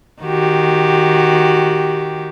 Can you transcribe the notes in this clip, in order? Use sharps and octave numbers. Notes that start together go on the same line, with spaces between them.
D#3 F#4 G4